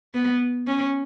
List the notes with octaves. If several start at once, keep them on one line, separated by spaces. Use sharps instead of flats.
B3
C#4